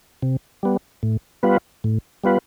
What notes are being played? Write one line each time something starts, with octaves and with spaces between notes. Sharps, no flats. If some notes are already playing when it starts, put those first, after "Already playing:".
C3
G3 B3
A2
G3 B3 F4 B4
A2
G3 B3 F4 B4